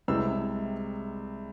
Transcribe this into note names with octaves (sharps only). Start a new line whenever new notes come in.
C2 C3 G#3 E6